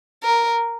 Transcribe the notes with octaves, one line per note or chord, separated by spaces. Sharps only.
A#4